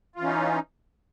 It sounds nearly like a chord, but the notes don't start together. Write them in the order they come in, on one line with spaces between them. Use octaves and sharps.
F4 E3 C#4 D#4